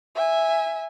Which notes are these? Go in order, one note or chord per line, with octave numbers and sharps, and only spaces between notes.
E5 G#5